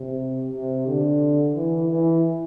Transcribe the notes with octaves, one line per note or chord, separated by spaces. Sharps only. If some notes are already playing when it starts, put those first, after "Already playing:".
Already playing: C3
C3
D3
E3
E3